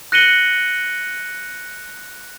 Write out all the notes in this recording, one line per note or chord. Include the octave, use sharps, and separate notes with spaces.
F#6 A#6 C#7 D#7 F#7 G7